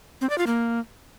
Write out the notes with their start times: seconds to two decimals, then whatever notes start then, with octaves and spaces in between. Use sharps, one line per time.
0.21 C4
0.30 D5
0.38 F4
0.47 A#3